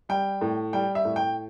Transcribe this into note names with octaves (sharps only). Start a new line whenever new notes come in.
G3 G5
A2
G3 G5
E5
A2
G5